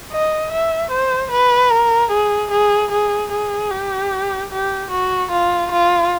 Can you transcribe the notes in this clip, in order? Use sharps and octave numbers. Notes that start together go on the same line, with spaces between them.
D#5
E5
C5
B4
A#4
G#4
G#4
G#4
G#4
G4
G4
F#4
F4
F4